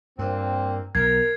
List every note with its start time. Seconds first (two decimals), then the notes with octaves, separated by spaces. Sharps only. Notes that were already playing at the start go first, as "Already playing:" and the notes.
0.19 G2 A#2 A#3 C4
0.95 B1 A#4 G#6 C7